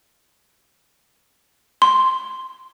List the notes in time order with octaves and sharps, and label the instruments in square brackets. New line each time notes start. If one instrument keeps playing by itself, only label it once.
[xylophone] C6